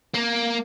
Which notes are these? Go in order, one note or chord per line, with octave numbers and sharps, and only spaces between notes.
A#3